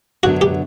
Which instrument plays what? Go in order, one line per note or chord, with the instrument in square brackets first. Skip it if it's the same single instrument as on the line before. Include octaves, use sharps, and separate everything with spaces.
[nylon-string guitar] F#2 D3 F#3 B3 D4 [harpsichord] F#4
[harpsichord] G4